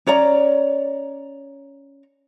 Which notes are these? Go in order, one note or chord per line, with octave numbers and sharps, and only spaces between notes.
C#4 C#5 D5 A#5